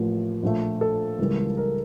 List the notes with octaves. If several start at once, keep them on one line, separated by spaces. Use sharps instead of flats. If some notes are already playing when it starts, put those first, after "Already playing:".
Already playing: A1 A2 F3 A#3
A#1 A#2 A3
A4
C#2 C#3 E3 G3 A#3
A#4